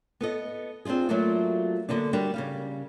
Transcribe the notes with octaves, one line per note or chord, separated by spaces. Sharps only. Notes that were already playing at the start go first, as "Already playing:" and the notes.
B3 A4 D#5
C4 D4 D#4 F4 G#4
F#3 A3 A#3 D4 F4 F#4
D3 A#3 B3 D4
G3 D4 F#4 A#4
C#3 G3 F5